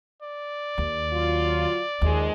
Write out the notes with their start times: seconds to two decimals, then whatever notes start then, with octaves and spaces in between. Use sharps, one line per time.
0.22 D5
0.78 D#2
1.12 F#3 F4
2.01 D#2 D#3 F3 G#3